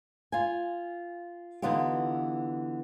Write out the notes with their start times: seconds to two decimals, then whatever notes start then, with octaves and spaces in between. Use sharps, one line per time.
0.32 F4 G#5
1.62 D3 E3 B3 D#4 F4 G4